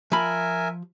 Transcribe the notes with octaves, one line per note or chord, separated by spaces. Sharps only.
F3 A#4 E5 G#5 B5